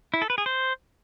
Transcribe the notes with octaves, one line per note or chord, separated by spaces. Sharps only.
E4
A4
B4
G#4
C5